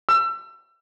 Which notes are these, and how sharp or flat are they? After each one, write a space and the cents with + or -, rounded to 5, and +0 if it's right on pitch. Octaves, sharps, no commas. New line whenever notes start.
E6 +35